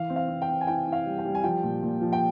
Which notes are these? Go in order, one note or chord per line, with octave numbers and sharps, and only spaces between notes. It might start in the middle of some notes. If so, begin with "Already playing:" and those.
Already playing: E3 F5
C4
F5
C4
G5
C4
G#5
E4 G5
E4
F5
G3
G5
G3
G#5
F3 G5
A#2
A#2
F3
G5